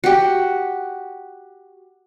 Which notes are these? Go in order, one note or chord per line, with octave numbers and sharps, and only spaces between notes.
F#4 G4